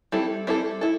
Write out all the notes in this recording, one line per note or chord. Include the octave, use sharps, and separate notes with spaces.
G3 C4 E4 A4
G3 C4 E4 A4
E4 A4